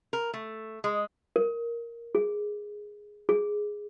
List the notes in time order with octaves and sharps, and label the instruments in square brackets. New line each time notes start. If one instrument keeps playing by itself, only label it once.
[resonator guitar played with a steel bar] A#4
A3
G#3
[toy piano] A#4
G#4
G#4